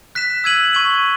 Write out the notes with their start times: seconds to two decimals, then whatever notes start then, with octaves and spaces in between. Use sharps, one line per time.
0.15 F#6 B6 E7
0.44 E6 G#6 D#7 F#7
0.73 C#6 G#6 D#7 F#7